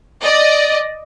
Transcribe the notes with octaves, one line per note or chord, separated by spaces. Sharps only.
D5 D#5